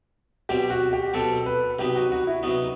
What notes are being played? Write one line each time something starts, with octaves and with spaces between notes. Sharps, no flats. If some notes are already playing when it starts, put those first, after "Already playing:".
B2 F#3 C4 G4
F#4
G4
B2 F#3 C4 A4
B4
C3 F#3 B3 D#4 G4
F#4
F#4
E4
C3 F#3 B3 D#4 F#4